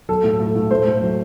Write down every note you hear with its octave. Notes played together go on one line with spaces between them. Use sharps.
F#3 A4
A2
A2
A2
A2 C5
A2
F#3